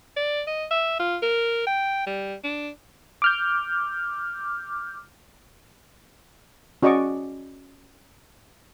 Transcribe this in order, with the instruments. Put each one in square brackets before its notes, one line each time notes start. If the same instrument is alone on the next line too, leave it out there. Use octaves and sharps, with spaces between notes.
[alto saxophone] D5
D#5
E5
F4
A#4
G5
G3
D4
[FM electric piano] D6 F6 G6
[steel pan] C#4 F#4 D5 D#5 C#6 D6